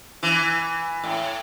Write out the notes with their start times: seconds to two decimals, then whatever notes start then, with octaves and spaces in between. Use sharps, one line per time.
0.23 E3
1.04 A2